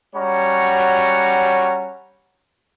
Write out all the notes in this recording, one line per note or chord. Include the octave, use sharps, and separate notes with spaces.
G3 C#4 F#4 C#5 F#5 A#5